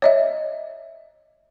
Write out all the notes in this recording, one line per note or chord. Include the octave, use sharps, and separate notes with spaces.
C#5 D#5 E5